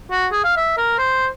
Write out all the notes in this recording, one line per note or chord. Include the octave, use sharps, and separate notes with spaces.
F#4
G#4
F5
E5
A#4
C5